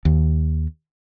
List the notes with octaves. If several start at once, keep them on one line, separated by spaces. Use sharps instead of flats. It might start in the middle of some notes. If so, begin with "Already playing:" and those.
D#2